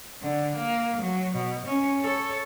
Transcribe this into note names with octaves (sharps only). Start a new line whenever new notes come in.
D3
A#3
F#3
B2
C#4
A4 C#5